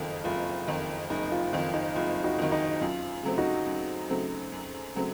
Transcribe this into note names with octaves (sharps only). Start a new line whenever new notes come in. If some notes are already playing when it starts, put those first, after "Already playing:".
Already playing: F#1 F2 D#3 F4 A4
F#1 F4
F2 D#3
F#1 D#4
F4
F2 D#3 F4
D#4
F#1 F4
D#4 F#4
F2 D#3
D#4
F#2 F4
C#3 F#3 A3 C4
D#4 F#4
F#2
C#3 F#3 A3 C4
F#2
C#3 F#3 A3 C4